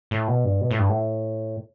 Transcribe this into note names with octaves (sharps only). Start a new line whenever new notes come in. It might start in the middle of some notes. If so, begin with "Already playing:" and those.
A2
B2
G2
B2
A2
G2
A2